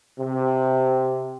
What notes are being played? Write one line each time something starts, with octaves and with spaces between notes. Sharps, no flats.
C3